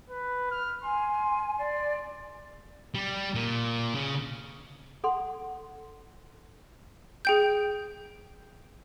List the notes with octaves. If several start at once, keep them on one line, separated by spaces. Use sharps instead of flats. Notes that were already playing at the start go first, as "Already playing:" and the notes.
B4
F6
G#5 C6
D5 C6
G3
A#2
C#3
A4 F#5 C6
G#4 G5 G6